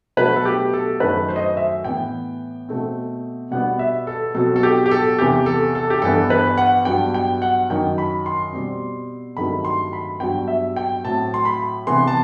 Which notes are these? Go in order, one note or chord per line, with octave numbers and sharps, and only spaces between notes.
B2 F#3 A3 B4
A4
G4
A4
F#2 D#3 A3 B4
C5
D#5
C5
E5
A2 E3 B3 G5
B2 A3 C4
B2 G3 B3 F#5
E5
A4
B2 F#3 C4 A4
A4
G4
G4
A4
E2 C3 E3 G4
A4
A4
G4
G2 E3 B3 A4
B4
F#5
G2 F#3 B3 G5
G5
F#5
F#2 D#3 F#3 G5
B5
C6
B2 G3 C4
G2 D#3 F#3 A3 C4 B5
C6
B5
G2 F#3 B3 G5
E5
G5
A2 F#3 C4 A5
C6
B5
C3 E3 B3 C6
A5